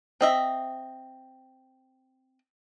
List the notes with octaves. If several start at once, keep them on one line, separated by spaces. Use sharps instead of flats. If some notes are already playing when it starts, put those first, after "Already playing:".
C4 D#5 E5